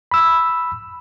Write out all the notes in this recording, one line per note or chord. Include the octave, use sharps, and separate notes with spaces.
B5 E6